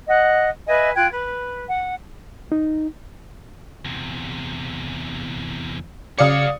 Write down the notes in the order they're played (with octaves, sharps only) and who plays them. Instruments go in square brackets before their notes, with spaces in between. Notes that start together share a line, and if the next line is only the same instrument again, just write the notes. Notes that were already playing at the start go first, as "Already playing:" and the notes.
[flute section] D#5 F#5
B4 D#5 E5 G#5
F4 G5 F#6 G#6
B4
F#5
[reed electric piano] D#4
[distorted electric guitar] E2 C3
[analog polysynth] C#3 C#7 [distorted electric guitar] C#5 F#5 [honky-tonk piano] D5 F5 D#6